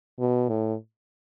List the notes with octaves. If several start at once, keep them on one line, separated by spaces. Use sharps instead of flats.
B2
A2